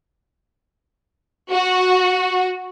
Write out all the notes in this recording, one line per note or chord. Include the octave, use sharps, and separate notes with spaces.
F#4